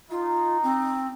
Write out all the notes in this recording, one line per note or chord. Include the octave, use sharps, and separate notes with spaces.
D#4 F4
C4